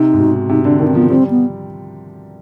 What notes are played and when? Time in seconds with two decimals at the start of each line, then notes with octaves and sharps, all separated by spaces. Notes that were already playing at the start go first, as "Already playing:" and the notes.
Already playing: C3 D#4
0.13 G#2
0.20 B2
0.49 C3 D#4
0.65 D3 D4
0.80 D#3 D#4
0.88 C4
0.95 F3 B3
1.10 G3 C4
1.30 B3